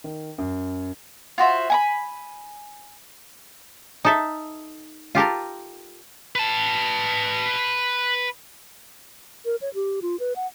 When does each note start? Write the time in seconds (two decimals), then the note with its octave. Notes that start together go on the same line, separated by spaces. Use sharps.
0.04 D#3
0.38 F#2
1.38 F4 F#4 C5 E5
1.70 G#5 A#5 B5
4.05 D#4 A4 E5
5.15 F4 G4 A4 A#4
6.36 B4 A5
9.45 A#4
9.61 C#5
9.74 G4
10.02 F4
10.20 B4
10.36 F#5